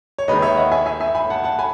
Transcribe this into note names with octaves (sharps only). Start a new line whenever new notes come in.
C#5
D#2 D#3 G#3 B4 D#5
C#5 E5
D#5 F#5
E5 G#5
E5 G#5
E5 G#5
G#5 B5
F#5 A5
F#5 A5
G#5 B5